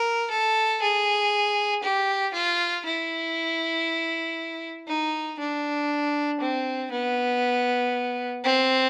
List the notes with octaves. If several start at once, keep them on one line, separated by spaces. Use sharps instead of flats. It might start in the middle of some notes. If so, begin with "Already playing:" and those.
Already playing: A#4
A4
G#4
G4
F4
E4
D#4
D4
C4
B3
C4